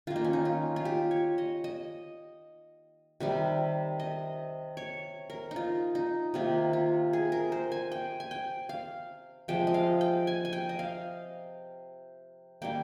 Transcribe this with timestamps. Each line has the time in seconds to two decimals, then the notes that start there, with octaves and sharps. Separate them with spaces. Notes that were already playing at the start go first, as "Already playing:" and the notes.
0.07 D#3 A#3 F4
0.16 D#4
0.24 C#4
0.33 D#4
0.45 F4
0.76 F4
0.85 G4
1.11 C#5
1.38 D#5
1.64 D#5
3.20 C3 D#3 G3
4.00 D#5
4.77 C#5
5.30 A#4
5.51 D#4
5.56 F4
5.95 D#4
6.34 C3 D#3 A#3 F4
6.73 F4
7.13 G#4
7.32 A#4
7.52 C5
7.72 G#5
7.92 G5
8.20 G#5
8.31 G5
8.69 F5
9.48 C3 F3 G#3 G5
9.67 D#5
9.74 F5
10.01 G5
10.27 G#5
10.45 G#5
10.53 G5
10.69 D#5
10.79 F5
12.62 D#3 G3 A#3 G5